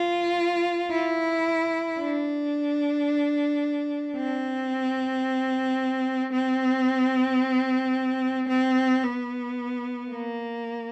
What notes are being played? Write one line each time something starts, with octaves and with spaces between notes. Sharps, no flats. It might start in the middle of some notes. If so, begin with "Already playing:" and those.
Already playing: F4
E4
D4
C4
C4
C4
B3
A#3